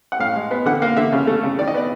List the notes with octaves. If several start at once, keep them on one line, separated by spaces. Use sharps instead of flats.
F#5
A2 F5
G#3
B3
D3 F#5
A#3 F5
D3 E5
C#3
A3
C#3
D#3 D5
D#5
B3 D5